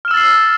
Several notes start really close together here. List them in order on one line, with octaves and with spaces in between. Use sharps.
F6 E7 E6 A6 C7